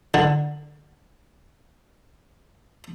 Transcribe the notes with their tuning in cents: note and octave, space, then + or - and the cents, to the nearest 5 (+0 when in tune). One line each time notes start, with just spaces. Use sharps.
D3 +15